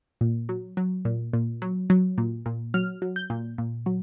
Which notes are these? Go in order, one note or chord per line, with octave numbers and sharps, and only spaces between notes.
A#2
F#3
F#3
A#2
A#2
F#3
F#3
A#2
A#2
F#3 F6
F#3
G6
A#2
A#2
F#3